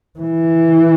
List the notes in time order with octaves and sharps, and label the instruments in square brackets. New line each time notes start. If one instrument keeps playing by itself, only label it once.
[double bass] E3